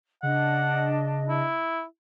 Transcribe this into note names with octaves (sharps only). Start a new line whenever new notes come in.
C#3 D4 D#5 F#5
E4